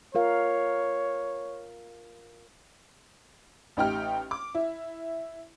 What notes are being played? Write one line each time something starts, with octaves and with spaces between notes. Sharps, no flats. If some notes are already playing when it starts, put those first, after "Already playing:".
F4 A#4 C#5 F5
A1 D#4 G4 G5 F6
D6
E4